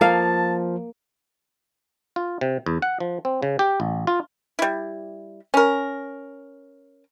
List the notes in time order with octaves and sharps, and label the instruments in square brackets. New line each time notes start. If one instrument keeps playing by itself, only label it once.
[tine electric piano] F3 [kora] A#3 F5 [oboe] A5
[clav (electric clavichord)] F4
C3
E2
F#5
F3
C4
C#3
G4
A1
F4
[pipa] G3 E4
C#4 A#4